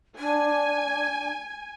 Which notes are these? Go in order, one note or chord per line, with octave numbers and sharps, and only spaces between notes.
D4 G#5